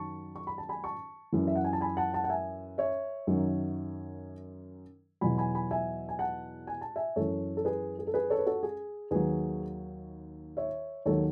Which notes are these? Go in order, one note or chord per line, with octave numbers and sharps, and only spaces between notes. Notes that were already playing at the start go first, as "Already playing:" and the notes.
Already playing: F#2 D#3 F#3 A5 C#6
C#6
B5
A5
G#5 B5
A5 C#6
F#2 E3
E5
F#5
G#5
A5
G#5 B5
F#5 A5
F#5 A5
F#5
E5 G#5
C#5 E5
F#2 D#3 F#3
E2 B2 F#3 G#5 B5
G#5 B5
G#5 B5
E5 G#5
G#5
F#5 A5
G#5
A5
E5 G#5
F#2 E3 A4 C#5
A4
G#4 B4
G#4
A4
G#4 B4
A4 C#5
B4
F#4 A4
G#4
D#2 D#3 F#3 G#4 B4
C#5 E5
D#2 D#3 F#3 A4 C#5